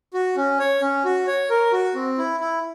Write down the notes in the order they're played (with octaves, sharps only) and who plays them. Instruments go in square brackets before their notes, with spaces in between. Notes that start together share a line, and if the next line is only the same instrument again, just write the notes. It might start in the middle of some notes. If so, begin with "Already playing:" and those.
[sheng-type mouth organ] F#4
C#4
C#5
C#4
F#4
C#5
A#4
F#4
C4
E4
E4